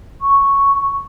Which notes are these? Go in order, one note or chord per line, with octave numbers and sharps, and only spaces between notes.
C#6